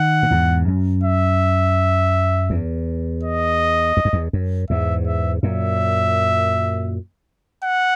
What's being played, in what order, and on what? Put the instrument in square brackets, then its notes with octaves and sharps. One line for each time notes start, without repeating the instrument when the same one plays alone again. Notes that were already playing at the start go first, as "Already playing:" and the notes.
Already playing: [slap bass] D#3 [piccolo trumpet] F#5
[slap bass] A#2
E2 G#2
F#2
[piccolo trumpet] E5
[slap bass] E2
[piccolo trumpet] D#5
[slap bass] E2
F#2
E2
F#2
[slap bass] E2 G#2 [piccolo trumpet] E5
[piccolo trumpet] E5
[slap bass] F#2 A#2 [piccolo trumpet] E5
[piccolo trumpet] F#5